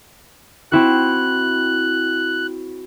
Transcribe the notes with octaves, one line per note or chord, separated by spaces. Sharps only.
C4 E4 F#4 F#6